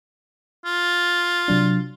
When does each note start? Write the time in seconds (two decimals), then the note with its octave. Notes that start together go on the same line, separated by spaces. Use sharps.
0.65 F4
1.48 C3 F#3 D4